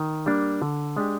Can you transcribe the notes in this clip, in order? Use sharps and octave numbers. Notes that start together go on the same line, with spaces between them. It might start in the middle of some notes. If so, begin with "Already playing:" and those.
Already playing: D#3
G3 A#3 D4
D3
G#3 D4 G4